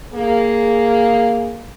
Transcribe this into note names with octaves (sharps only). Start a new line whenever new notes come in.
A#3 G#4